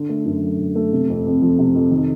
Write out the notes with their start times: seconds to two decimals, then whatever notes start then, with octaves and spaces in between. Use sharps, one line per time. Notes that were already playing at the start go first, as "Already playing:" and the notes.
Already playing: D3
0.09 A3
0.25 F#2
0.42 F#3
0.59 D3
0.76 A3
0.92 C3
1.09 F2
1.26 F2
1.42 F3
1.59 C3
1.74 F2
1.91 D#3